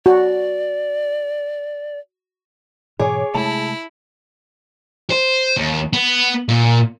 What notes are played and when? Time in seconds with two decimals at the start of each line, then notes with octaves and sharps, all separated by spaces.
0.06 F#4 D5
3.00 G#2 B2 E3 G#4 C#5 D6
3.35 C3 G#3 A3 E4 A5
5.10 C5
5.57 D#2
5.93 B3
6.49 A#2